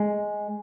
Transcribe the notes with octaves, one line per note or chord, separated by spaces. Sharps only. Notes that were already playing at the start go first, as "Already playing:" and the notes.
Already playing: G#3